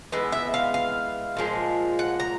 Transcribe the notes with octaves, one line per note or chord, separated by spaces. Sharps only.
E3 G#3 B3
E5
F5
F5
A#2 F3 G#3
F#5
A#5